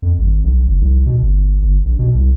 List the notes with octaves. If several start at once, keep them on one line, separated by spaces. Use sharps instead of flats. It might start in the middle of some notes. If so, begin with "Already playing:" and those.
F2
G#1
B1
F#1
C2
B2
G1
G1
A#1
B2
C2